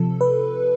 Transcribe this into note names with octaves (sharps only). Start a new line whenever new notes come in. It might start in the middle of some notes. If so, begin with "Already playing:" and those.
Already playing: C3 F3 A4
B4